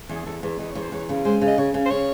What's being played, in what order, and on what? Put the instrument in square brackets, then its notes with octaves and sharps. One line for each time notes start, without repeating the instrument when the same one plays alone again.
[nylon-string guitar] E2
[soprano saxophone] G#4
[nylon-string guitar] E2 [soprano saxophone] A4
[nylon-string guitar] E2
[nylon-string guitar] E2 [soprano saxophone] D#5
[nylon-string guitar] E2 [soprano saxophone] C#5
[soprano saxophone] C5
[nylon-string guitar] E2 [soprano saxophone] C#5
[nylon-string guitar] C#3
[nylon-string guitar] G#3 [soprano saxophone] C5
[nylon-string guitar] C#3
[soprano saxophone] D#5
[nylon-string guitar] C#3 [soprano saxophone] C#5
[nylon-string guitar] C#3
[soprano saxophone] C5
[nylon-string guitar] C#3 [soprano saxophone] C#5